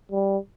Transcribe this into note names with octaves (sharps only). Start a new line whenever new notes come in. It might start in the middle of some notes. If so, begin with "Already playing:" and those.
G3